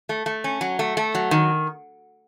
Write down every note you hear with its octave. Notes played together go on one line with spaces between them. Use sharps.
A3
A3
C#4
F#3
A3
A3
F#3
D#3